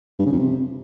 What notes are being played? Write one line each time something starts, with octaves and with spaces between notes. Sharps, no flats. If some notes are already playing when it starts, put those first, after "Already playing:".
G2
C#3
F2
C3